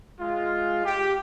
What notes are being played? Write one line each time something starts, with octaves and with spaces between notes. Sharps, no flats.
G#3 F4
G4